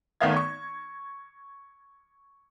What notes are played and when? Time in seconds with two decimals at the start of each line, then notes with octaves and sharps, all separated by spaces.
0.21 G#1 D#3 A3 B3 F5 G#6
0.36 C#6